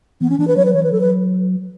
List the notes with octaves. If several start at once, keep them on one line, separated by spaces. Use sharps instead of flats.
E3 B3
C#4
E3 D4
B4
F#3 C#5
B4
E3 C#5
B4
F#3 A4
B4